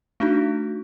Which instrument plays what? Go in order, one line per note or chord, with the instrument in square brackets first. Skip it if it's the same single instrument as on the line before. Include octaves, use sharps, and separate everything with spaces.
[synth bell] A3 D4 D#4 F#4